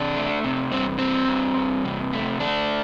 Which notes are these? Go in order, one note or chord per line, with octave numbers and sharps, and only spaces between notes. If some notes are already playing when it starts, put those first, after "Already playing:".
Already playing: C3 D4
A3
C3
G2 C4
G2 C4
G2
G2
C3
A3
A3 D4